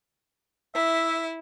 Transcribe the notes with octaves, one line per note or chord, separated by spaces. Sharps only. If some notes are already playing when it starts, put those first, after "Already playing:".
E4 E5